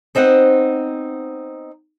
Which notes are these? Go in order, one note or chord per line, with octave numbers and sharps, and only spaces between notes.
B3 C4 D#4 C5 F#5